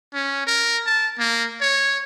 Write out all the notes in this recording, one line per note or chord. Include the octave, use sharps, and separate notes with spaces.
C#4
A#4
A5
A#3
C#5